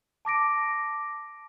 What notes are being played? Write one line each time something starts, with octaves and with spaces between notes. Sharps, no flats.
A5 D6 A#6 D7